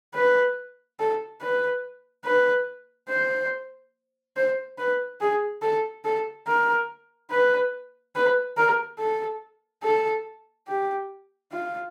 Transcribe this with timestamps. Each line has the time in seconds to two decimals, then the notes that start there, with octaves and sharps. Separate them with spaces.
0.15 B4
1.00 A4
1.41 B4
2.26 B4
3.09 C5
4.37 C5
4.78 B4
5.21 G#4
5.62 A4
6.05 A4
6.47 A#4
7.31 B4
8.15 B4
8.57 A#4
8.99 A4
9.84 A4
10.68 G4
11.52 F4